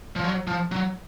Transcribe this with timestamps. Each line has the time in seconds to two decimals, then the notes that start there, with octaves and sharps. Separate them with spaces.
0.16 F3
0.24 F#3
0.47 F3
0.72 F#3